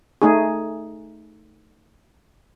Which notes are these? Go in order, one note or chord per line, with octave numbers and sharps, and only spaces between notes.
A3 D#4 G#4